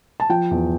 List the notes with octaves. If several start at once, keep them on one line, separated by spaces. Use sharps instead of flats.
A5
F3 G5
E2